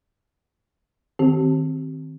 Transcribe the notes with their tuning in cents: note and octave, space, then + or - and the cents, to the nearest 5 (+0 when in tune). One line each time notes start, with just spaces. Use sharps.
D#3 +0 C4 +0 G4 -35